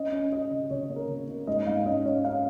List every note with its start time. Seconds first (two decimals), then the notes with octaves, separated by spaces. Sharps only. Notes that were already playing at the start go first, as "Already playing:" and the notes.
Already playing: C#4 D#5
0.12 C#4
0.31 C#4 D#5
0.51 C#3
0.70 C#3 C#5
0.89 A#3
0.96 A#4
1.08 C#3
1.29 A#3
1.47 G#2 D#5
1.66 G#2 F5
1.86 C#4 D#5
2.05 C#4 C#5
2.24 C#4 F5